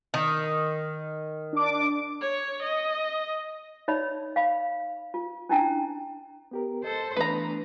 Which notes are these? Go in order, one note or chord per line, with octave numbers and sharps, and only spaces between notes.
D#3
D4 D6
C#5
D#5
D#4 C#5 D5 E5 B5
F5 B5
F4
C#4 D4 E4 G5 A5 A#5
B3 G4 A#4
A4 C5 D#5
E3 A3 B3 D4 B4 A#5